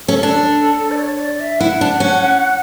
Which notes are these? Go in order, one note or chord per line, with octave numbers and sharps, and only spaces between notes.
C#4 A4
D4 A4
D5
C#5
C#5
D5
E5
E4 F#5
D4
C#4